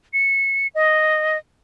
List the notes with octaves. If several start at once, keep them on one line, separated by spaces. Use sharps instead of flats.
C#7
D#5